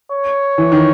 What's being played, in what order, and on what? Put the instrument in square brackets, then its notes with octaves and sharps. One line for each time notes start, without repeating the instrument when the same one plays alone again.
[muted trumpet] C#5
[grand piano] E3
D#3